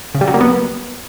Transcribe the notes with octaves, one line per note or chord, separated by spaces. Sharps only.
C#3
G3
F#3
A#3
B3